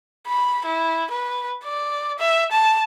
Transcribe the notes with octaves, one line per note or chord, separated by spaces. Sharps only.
B5
E4
B4
D5
E5
A5